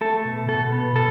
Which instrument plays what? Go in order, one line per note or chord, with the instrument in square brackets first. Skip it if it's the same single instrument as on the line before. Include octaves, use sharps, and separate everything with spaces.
[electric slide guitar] A3 A4
B2
B2 A4
B3
B2 A4